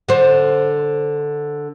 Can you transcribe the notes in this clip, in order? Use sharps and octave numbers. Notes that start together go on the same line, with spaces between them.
D3 C5